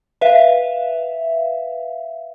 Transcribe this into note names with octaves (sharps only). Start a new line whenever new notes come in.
B4 E5 F5